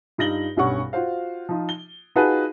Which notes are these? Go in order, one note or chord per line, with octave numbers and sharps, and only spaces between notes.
G2 D#4 F4 A#6 F#7 G7
B1 G2 G3 C#4 F#5 C#6
F4 F#4 C5 F5
F3 D#4 F4
G7
D#4 F4 F#4 G#4 B4 A5